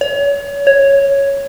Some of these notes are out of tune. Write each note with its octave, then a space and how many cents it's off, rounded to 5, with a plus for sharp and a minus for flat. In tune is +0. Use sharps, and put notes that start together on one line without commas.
C#5 +35
C#5 +0